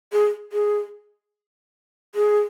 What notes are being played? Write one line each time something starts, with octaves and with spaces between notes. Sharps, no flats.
G#4
G#4
G#4